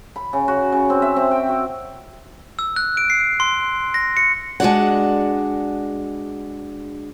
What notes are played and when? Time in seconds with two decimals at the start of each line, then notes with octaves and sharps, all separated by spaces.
0.16 B5
0.33 C#3
0.48 F#4
0.72 C#3
0.90 C4
1.02 E5
1.16 C4
1.31 G5
1.48 F#4
2.59 E6
2.76 F#6
2.97 D7
3.10 C7
3.40 C6
3.94 A#6
4.17 C#7
4.60 G#3 D4 F#4 D5 F#5